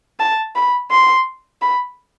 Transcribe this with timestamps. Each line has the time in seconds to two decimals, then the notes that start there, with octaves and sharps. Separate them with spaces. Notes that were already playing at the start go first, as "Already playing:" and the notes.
0.19 A5
0.55 B5
0.91 C6
1.61 B5